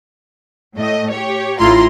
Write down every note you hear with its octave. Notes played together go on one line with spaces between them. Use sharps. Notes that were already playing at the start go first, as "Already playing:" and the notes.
A2 A3 D#5
G4 C#5
A1 A2 E4 F4 A#5 C6